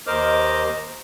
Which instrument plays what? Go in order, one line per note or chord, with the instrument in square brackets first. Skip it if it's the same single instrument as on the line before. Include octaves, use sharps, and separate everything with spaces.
[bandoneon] D#2 A#4 C5 D#5 D6 F6